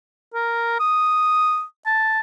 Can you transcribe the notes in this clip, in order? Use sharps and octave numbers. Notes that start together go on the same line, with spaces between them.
A#4
D#6
A5